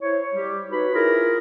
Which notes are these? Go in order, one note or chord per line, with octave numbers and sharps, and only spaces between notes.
E4 C5 C#5
G3 G4
D#4 F#4 B4 C#5 B5
E4 F4 G#4 A#4